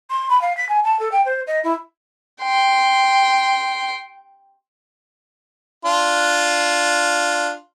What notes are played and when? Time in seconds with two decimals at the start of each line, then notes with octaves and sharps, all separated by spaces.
0.10 C6
0.30 B5
0.41 F5
0.57 B6
0.69 G#5
0.84 A5
1.00 A4
1.12 G5
1.25 C5
1.47 D#5
1.64 E4
2.42 G5 C6
5.85 D4 F4 C6